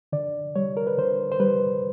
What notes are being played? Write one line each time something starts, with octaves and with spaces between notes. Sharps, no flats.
D3 D5
G3 C#5
A#4
B4
D3 C5
C5
G3 B4